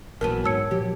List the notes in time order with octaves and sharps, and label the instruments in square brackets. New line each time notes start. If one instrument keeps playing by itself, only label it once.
[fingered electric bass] A#1 [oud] E2 F#3 B3 [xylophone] A#4 D#7 [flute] A5
[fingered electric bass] G#2 [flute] C#5 [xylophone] A5 E6 C#7
[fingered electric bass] A#2 F3 F#3 [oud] G4